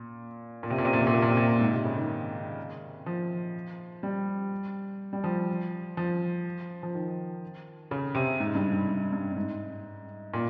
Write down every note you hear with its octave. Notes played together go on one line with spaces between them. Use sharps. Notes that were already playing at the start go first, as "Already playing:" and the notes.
Already playing: A#2
A#2
C3
A#2
C3
A#2
C3
A#2
C3
A#2
C3
A#2
G#2
C3
C#3
D#3
F3
G3
G3
F3
F3
F3
D#3
C#3
C3
G#2
G2
G#2
G2
G2
G2
G#2
A#2